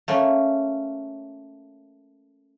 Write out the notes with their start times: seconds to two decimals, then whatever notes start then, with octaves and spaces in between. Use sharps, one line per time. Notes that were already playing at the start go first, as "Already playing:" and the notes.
0.08 A3 A#3 C#4